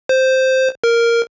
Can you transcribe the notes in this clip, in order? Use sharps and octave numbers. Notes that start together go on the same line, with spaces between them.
C5
A#4